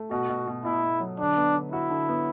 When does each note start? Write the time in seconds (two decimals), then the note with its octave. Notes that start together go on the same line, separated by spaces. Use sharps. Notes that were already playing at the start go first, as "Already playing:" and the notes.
Already playing: A3
0.11 B2 F#4
0.30 B2
0.47 B2
0.64 B2 E4
0.83 B2
1.00 F#3
1.19 D3 D4
1.37 B3
1.54 D3
1.72 E4 F#4
1.90 D3
2.09 B3